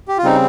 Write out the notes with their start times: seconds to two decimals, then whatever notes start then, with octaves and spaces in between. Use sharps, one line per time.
0.08 G4
0.18 F4
0.23 C#3 G3 C4 D#4